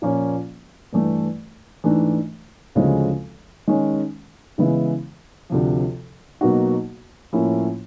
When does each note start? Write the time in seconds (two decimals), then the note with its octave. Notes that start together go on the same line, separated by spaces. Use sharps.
0.02 A#2 F3 A#3 C#4 F4
0.93 G2 E3 A3
1.84 G#2 E3 A3 D4
2.75 D2 C#3 F3 G#3 C4
3.67 D#3 G#3 C#4
4.58 C#3 E3 G#3 B3 E4
5.50 D2 C3 F3
6.41 B2 F#3 A#3 D#4 F#4
7.33 A2 F3 A#3 C#4 E4